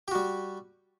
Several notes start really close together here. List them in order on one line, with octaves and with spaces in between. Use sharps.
G4 F#4 G3